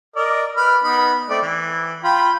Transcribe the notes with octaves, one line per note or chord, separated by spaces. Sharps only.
A#4 D5 D#5
B4 B5 F6
B3 D#4 B5
A3 C4 D5
E3
F4 G5 B5